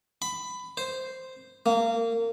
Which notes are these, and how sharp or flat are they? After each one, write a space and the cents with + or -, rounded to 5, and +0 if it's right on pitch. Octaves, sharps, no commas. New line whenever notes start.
B5 +15
C5 -5
A#3 -25